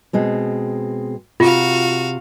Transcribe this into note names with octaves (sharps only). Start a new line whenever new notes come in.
B2 G#3 C4
C3 F4 F#4 F5